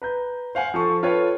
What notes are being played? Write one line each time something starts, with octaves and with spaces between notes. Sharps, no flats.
B4 A#5 G6
C5 F5 F#5 G#5
F3 A4 C#6
F4 A4 B4 C#5 F5 G5